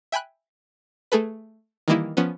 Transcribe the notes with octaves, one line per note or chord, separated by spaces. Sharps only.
E5 G5 G#5 B5 F#6
A3 G#4 A4 B4
D#3 E3 G3 A#3 D#4 E4
F3 B3 C#4